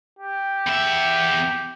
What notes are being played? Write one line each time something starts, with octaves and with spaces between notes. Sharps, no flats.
G4
E2 E5